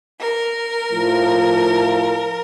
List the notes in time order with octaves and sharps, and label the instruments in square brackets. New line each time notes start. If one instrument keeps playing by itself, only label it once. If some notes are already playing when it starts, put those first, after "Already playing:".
[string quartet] A#4
[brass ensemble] A2 F3